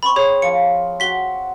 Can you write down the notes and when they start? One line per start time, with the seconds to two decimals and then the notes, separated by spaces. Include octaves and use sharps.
0.03 C4 B5 C#6
0.16 G#4 C#5
0.42 F3 C#7
1.00 F#4 B6 G7